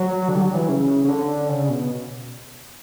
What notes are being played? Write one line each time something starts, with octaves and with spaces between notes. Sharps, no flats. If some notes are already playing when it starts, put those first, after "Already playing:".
Already playing: F#3
D3
G3
F#3
E3
C#3
C#3
D3
C#3
B2